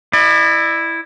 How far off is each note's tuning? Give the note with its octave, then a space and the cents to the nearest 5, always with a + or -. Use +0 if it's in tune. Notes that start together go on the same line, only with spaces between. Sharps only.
E4 +0 D5 +40